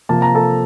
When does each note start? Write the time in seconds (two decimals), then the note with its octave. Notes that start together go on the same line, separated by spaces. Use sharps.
0.09 C3 F3 A#3 A5
0.22 A#5
0.35 A4 A5